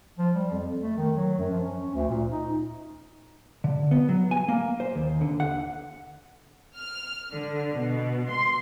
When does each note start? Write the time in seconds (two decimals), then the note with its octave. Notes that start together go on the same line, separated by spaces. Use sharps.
0.18 F3
0.35 G3
0.51 F2
0.81 A3
0.97 D#3
1.16 F#3
1.39 F#2
1.51 F3
1.62 C#4
1.94 D2
2.09 A#2
2.31 D#4
3.64 D3
3.91 B3
4.09 F#3
4.31 G#5
4.48 A#3
4.80 C5
4.95 D#2
5.21 D3
5.40 F#5
6.77 F6
7.32 D3
7.73 B2
8.30 C6